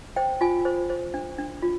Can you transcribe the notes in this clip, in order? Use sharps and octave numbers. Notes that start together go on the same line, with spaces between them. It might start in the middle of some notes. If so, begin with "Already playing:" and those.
C5 G5
F4 G#5
C5
C5
D4
D4
F4